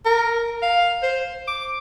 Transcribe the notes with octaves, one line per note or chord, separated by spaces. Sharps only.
A#4
F5
C5
D6